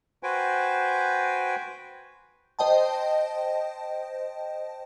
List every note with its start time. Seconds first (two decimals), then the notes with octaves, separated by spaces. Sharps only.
0.23 F#4 B4 C5 G5 G#5
2.59 C5 D#5 G5 A5